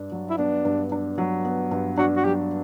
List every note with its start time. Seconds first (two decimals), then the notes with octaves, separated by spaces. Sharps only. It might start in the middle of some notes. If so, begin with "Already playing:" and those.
Already playing: G2 D4
0.12 F#3
0.30 E4
0.38 B3 D4
0.65 G2
0.92 D4
1.18 F#3
1.45 B3
1.71 G2
1.97 D4 F#4
2.17 F#4
2.25 F#3 G4